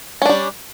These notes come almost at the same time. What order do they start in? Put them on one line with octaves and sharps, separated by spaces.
C#4 D4 G3